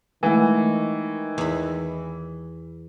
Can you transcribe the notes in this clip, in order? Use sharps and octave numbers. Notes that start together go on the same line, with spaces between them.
D#3 E3 G#3 A3
E2 B5